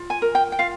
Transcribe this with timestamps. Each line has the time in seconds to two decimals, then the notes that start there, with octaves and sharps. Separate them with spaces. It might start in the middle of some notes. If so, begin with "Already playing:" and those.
Already playing: F4
0.10 G#5
0.22 A#4
0.35 G5
0.52 G5
0.59 F4 F5